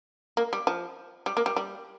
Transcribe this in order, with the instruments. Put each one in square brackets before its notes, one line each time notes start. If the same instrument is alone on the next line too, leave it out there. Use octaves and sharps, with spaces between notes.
[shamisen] A#3
G3
F3
G3
A#3
G3
G3